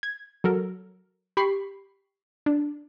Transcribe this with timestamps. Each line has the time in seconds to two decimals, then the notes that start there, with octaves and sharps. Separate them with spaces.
0.03 G#6
0.44 F#3 A4 A#4
1.37 G4 B5 C#6 C7
2.46 D4